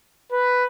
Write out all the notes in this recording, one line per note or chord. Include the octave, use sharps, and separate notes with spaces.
B4